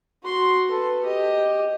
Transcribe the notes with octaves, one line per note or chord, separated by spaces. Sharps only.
F#4 C6
A4 B4
G4 D#5